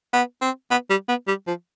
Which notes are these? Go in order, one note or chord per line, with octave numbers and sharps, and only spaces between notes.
B3
C4
B3
G3
B3
G3
F3